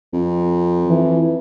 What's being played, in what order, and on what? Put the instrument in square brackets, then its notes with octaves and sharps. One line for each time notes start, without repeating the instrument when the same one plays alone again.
[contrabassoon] F2
[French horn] E3